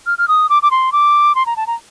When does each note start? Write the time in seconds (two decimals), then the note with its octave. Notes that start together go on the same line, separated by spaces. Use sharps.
0.06 F6
0.18 F6
0.28 D#6
0.49 D6
0.62 D6
0.71 C6
0.92 D6
1.35 C6
1.46 A#5
1.57 A5
1.67 A#5